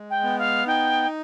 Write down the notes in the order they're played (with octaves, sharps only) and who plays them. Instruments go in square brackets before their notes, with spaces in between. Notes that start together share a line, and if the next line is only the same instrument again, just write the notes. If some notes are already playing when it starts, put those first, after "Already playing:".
Already playing: [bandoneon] G#3
[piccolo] G5
[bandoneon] B3
[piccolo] F5
[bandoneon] D#4 [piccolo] G5